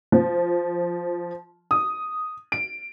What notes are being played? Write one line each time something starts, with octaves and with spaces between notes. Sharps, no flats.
F3
D#6
D7